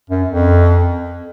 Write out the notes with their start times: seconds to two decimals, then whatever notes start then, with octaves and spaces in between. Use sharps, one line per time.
0.10 F#2
0.29 F2